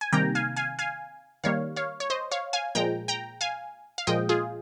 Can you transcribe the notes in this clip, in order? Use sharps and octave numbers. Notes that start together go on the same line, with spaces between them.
G#5
C3 D#3 G3 A#3 G5 A#5
F5 G#5
F5 G#5
F5 G#5
D#3 G3 A#3 C#5 F5
C#5 F5
C#5
C5 D#5
C#5 F5
F5 G#5
A#2 F3 G#3 G5 A#5
G5 A#5
F5 G#5
F5
A#2 F3 G#3 D#5 G5
F4 G#4